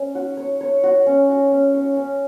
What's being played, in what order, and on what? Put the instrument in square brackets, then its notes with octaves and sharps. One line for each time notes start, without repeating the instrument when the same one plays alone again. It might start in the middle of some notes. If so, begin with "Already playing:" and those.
Already playing: [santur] C#4
F#4
C#5
C#5
F#4
C#4
F#4
C#4
C#5
C#4